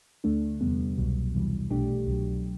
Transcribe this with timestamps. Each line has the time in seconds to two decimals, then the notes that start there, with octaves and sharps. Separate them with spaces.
0.24 D2 D3 A3 D4
0.61 E2 C3 G3 B3
0.98 C2 B2 F#3
1.34 E2 C3 E3 G3
1.70 B1 B2 A3 D4 G4
2.07 C2 B2 F#3